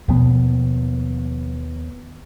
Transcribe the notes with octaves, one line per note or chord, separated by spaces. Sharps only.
D#2 B2 F3 B3